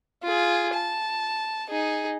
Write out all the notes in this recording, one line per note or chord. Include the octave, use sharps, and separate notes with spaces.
F4 G#4
A5
D#4 G#4